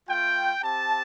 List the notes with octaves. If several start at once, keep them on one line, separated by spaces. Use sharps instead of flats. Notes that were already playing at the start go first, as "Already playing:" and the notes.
A3 F4 G5
C4 G4 A5